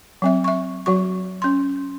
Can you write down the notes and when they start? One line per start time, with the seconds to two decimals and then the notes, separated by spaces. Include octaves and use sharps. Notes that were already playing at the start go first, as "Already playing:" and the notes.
0.22 F#3 C4 E5
0.44 E5 C#6
0.86 F#3 F#4 C#6
1.42 C#4 C6